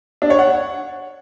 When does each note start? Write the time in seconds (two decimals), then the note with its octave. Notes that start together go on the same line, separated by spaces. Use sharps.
0.22 D4
0.30 C#5
0.39 F#5